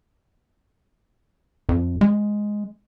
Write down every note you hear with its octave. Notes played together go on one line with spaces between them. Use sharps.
F2
G#3